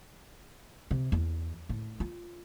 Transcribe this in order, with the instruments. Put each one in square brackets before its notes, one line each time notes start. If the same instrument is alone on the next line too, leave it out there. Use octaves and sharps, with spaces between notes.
[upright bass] C3
E2
A2
F4